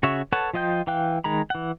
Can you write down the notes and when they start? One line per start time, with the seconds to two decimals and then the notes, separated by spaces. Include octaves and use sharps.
0.03 C#3 F#4 C#5 E5
0.32 A4 B4 C#5 F#5 A5
0.53 F3 F4 D#5 G5 G6
0.87 E3 F5 G5 F#6
1.24 D#3 G#3 A#5 B5
1.50 E3 F#5